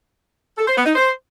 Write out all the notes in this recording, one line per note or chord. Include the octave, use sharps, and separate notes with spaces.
A4
C5
B3
D#4
C5